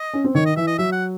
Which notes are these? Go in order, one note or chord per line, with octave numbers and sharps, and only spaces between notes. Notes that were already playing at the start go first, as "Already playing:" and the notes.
Already playing: D#5
C#4
C4
D#3 C#5
D#5
E3 E5
D#5
F#3 E5
F#5